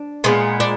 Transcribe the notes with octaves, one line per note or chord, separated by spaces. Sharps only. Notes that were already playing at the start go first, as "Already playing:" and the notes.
Already playing: D4
A#2 G#3 B3
D4